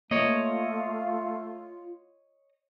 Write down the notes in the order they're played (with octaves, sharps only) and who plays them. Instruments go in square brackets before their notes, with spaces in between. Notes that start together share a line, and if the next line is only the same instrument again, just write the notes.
[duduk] A3 [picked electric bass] A#3 [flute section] F4 [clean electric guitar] C#5 D#5